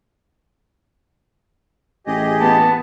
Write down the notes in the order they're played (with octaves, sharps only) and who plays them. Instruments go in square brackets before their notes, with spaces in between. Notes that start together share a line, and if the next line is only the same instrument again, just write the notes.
[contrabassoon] A1 [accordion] G4 G#4 D#5
[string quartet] B3 [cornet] A5